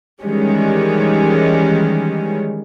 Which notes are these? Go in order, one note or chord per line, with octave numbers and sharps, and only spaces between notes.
D#3 E3 G3 G#3 C#4